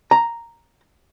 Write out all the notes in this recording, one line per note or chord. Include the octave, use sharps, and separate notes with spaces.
A#5